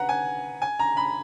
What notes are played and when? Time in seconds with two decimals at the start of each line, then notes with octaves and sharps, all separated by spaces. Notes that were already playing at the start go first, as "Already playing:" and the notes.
Already playing: B4 F#5 A#5
0.09 G#5
0.62 G#5
0.79 A#5
0.97 B5